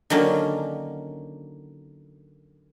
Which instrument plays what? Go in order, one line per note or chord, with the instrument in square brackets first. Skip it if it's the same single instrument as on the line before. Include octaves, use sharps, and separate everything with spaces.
[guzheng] D3 D#3 F#3 A#3 C#4